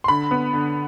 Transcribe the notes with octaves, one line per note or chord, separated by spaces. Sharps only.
C6
D3 B5
B3
D3